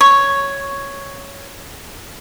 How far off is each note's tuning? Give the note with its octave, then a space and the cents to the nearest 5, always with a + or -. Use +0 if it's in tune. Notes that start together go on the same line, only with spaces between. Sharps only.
C#5 +0